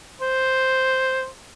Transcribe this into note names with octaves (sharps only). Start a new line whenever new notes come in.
C5